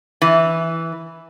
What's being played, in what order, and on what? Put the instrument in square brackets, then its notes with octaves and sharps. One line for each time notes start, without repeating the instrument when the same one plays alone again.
[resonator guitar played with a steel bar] E3